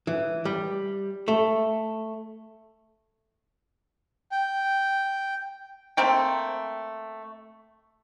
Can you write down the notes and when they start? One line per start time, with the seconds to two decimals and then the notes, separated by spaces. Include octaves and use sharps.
0.07 E3
0.45 G3
1.28 A3
4.32 G5
5.97 A3 A#3 C4 G5